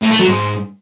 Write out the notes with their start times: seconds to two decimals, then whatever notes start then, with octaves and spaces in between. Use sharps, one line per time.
0.02 A2
0.11 A3
0.19 F#3
0.28 G#2